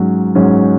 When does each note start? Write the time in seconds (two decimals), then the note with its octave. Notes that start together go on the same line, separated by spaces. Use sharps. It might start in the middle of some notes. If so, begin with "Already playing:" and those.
Already playing: G#2 F#3 C#4
0.35 G#2 F#3 C#4